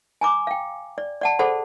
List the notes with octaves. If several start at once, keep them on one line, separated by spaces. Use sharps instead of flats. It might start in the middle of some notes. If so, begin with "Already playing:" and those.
G#5 A#5 D6
F5 G5
D5
D5 F#5 A5
G#4 A4 C5 D5 F#5 B5